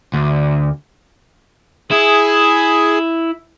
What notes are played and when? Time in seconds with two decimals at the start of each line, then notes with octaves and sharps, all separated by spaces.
0.14 D2
1.91 E4 G#4